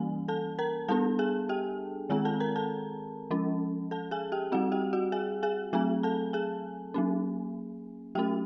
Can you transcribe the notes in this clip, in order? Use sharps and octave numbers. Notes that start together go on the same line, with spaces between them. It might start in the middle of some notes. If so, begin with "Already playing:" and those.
Already playing: E3 G3 A#3 C#4 G#5
A4 A5
A#4 A#5
G3 B3 D4 A4 A5
G#4 G#5
G4 G5
D#3 G#3 C4 G#4 G#5
A4 A5
A#4 A#5
A4 A5
F3 G#3 C#4
A4 A5
G#4 G#5
G4 G5
G3 C4 F#4 F#5
G4 G5
F#4 F#5
G#4 G#5
G#4 G#5
F#3 A3 C4 G#4 G#5
A4 A5
G#4 G#5
F#3 A#3 C#4
F#3 A3 C#4 G4 G5